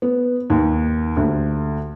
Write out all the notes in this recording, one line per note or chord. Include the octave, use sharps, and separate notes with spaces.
B3
D#2
D2